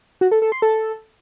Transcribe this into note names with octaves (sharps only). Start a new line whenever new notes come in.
F#4
A4
A4
C6
A4